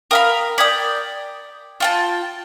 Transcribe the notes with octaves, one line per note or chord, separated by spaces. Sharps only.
A#4 F5 G5 B5 D#6
D5 G5 D#6 G#6 B6
F4 G5 A5